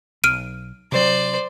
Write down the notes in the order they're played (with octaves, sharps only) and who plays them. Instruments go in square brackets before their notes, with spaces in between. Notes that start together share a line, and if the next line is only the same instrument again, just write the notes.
[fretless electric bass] B1 [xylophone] F6 D7 D#7
[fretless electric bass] C3 F#3 [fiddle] C5 D5